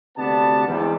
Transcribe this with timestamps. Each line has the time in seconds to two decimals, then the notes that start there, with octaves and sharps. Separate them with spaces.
0.17 D2 C3 B3 D5 A5
0.67 E2 G#2 G3